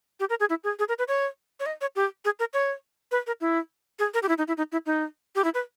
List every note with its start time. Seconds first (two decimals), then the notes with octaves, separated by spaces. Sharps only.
0.20 G4
0.30 A#4
0.40 G#4
0.50 E4
0.64 G#4
0.79 G#4
0.88 A#4
0.99 B4
1.08 C#5
1.60 C#5
1.66 D#5
1.81 C#5
1.96 G4
2.25 G#4
2.39 A#4
2.53 C#5
3.11 B4
3.27 A#4
3.41 E4
3.99 G#4
4.14 A#4
4.23 G4
4.29 E4
4.38 D#4
4.48 E4
4.57 D#4
4.72 E4
4.86 D#4
5.35 G4
5.44 E4
5.54 B4